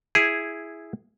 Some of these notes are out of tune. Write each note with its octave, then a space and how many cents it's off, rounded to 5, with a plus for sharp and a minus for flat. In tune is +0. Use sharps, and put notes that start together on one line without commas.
E4 +0 G#4 +0